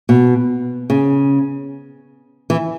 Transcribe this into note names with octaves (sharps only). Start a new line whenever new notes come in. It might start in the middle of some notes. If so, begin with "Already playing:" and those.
B2
C#3
E3